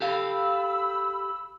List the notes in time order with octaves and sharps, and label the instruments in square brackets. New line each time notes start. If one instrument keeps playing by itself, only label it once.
[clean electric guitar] G4 A4 F5 [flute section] B5 E6